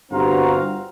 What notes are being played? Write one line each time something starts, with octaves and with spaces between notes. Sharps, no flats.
G1 G2 C4 F#4 F5 A#5